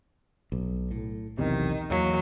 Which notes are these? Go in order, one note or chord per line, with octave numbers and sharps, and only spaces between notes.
B1
A2
B1 E2 C3 D#3
E2 F#3 G3 A#3